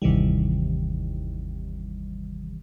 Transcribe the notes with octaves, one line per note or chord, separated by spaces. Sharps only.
G1 D#2 C3 D#3 E3 G3